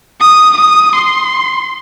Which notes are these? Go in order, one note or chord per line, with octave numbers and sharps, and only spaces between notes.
D#6
D#6
C6